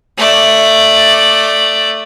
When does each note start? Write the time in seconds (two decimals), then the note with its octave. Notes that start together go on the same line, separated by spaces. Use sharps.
0.17 A3 D5